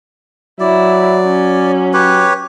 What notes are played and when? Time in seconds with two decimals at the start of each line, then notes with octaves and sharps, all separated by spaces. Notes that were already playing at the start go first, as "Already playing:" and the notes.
0.60 F#3 E4 D5
1.24 C#4
1.94 G4 B4 C#5